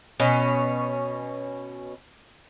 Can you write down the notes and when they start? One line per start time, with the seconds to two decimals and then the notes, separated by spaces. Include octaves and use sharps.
0.20 B2 C#4